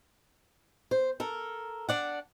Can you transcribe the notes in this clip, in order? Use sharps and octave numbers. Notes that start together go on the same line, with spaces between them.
C5
A4 A#4
D4 D5 F#5